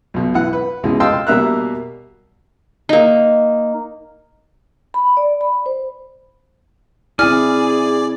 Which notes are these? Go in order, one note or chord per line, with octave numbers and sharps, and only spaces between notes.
B1 B2
E3 F#5
B4
C#2 B2 E3 G#3
D#5 F5 G5 A5 C6 E6
B2 G3 A#3 E5 A#5 F#6
A#3 D#4
B5
D5
B5
C5
C4 E4 G#4 D5 G#5 F6